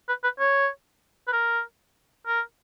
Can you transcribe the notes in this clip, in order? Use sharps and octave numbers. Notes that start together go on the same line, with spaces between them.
B4
B4
C#5
B4
A#4
A#4